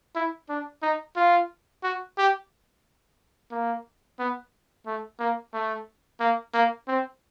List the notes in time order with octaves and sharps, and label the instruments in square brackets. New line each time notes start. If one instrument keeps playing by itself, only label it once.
[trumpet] E4
D4
D#4
F4
F#4
G4
A#3
B3
A3
A#3
A3
A#3
A#3
C4